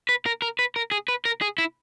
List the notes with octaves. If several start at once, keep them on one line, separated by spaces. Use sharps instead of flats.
B4
A#4
A#4
B4
A#4
G#4
B4
A#4
G#4
E4